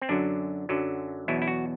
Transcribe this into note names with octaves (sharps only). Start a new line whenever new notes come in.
C4
F#2 D3 F#3 D4
F#2 D3 F#3
E2 B2 F#3 E4
E4
F#4